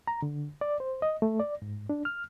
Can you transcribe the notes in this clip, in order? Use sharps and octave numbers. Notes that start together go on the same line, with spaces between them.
A#5
D3
D5
C5
D#5
A3
D5
G#2
D4
F6